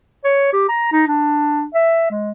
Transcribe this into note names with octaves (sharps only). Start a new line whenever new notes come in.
C#5
G4
A#5
D#4
D4
E5
G#3